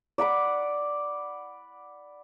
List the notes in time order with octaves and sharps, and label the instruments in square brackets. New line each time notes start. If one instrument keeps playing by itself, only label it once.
[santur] D5 F#5 B5 D6